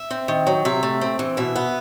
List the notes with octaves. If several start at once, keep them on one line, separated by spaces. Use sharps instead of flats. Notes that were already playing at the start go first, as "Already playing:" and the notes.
Already playing: E5
C4
D#3
F#3
C3 E5
A3
C4
E3
B2 E5
B3